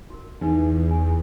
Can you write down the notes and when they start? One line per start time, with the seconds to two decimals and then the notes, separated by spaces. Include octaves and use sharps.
0.10 F#4 A#4
0.41 E2 D#4 B4 G#5
0.91 G#5